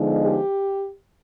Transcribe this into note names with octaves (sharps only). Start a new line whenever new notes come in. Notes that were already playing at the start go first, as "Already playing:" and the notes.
Already playing: D3 F3 G#3 B3 D#4
G4